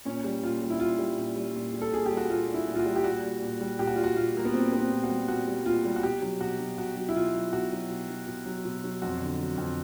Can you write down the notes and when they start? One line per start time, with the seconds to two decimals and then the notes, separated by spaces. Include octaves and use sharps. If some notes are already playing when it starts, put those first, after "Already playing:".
0.05 A#2 C#4
0.24 G3
0.43 A#2 F4
0.62 G3
0.70 E4
0.80 A#2 F4
0.99 G3
1.17 A#2
1.36 G3
1.54 A#2
1.74 G3
1.82 A4
1.92 A#2 G#4
2.06 G4
2.11 G3
2.17 F#4
2.30 A#2 F4
2.48 G3
2.54 E4
2.67 A#2
2.75 F4
2.79 F#4
2.86 G3
2.96 G4
3.04 A#2 F#4
3.23 G3
3.42 A#2
3.61 G3
3.79 A#2 G4
3.87 F#4
3.96 G3 F4
4.04 F#4
4.16 A#2 F4
4.35 G3 A#3
4.45 B3
4.54 A#2 C4
4.72 G3 B3
4.79 C4
4.91 A#2
5.04 F#4
5.09 G3
5.28 A#2 F#4
5.47 G3
5.66 A#2 F4
5.85 G3
5.96 F#4
6.03 B2 G4
6.22 F#3
6.41 B2 F#4
6.59 F#3
6.78 B2 F#4
6.96 F#3
7.09 E4
7.15 B2 F4
7.34 F#3
7.53 B2 F#4
7.72 F#3
7.90 B2
8.09 F#3
8.28 B2
8.46 F#3
8.65 B2
8.84 F#3
9.02 F2 F#4
9.21 D3
9.40 F#3
9.58 F2